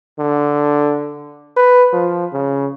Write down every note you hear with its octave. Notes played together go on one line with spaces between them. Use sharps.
D3
B4
F3
C#3